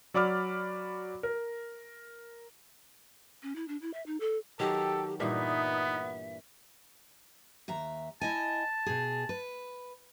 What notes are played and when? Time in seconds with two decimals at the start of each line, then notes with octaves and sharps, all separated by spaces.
0.14 F#3 D5 B5 D6 F6
1.23 A#4
3.43 C#4
3.56 E4
3.68 D4
3.82 E4
3.94 E5
4.06 D#4
4.20 A4
4.60 D#3 F#3 G4 A4 G5
5.20 G2 A#2 E3 B3 D#4 E5
7.68 D#2 E5 A#5
8.21 E4 D#5 G#5 A5
8.86 B2 G#4
9.29 B4